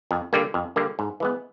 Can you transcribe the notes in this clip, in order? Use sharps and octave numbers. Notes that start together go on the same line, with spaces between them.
F2
D3 G3 A#3
F2
D3 G3 A#3
G#2
E3 G#3 B3